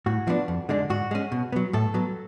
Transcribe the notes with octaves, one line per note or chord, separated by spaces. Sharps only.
A2 F#4
F3 B3 D4
F2
D3 G#3 D4
G#2 F#4
G#3 C#4
B2
F#3 B3
A2 A4
F#3 B3